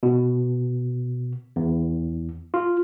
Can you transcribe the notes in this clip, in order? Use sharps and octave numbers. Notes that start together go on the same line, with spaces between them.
B2
E2
F4